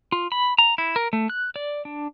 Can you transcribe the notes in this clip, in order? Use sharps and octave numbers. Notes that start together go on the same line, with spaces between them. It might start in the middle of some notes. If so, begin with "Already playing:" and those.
F4
B5
A#5
E4
A#4
A3
F#6
D5
D4